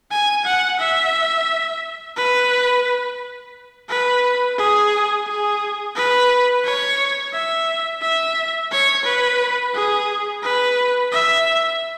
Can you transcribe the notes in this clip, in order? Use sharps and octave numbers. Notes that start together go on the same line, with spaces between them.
G#5
F#5
E5
B4
B4
G#4
G#4
B4
C#5
E5
E5
C#5
B4
G#4
B4
E5